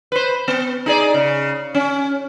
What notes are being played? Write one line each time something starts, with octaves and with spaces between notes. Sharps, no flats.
B4 C5
B3
D#4 G#4 D5
C#3
C#4